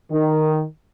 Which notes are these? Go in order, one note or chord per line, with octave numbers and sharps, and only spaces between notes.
D#3